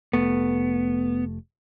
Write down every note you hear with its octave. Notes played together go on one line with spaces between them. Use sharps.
F1 A3 B3